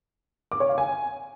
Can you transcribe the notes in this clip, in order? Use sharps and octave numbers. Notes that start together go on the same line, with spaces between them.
D6
C#5
F5
G#5